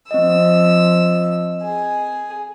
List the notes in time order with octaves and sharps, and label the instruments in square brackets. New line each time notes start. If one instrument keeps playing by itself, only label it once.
[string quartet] F3 E6 [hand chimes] C4 D#5
[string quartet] G#4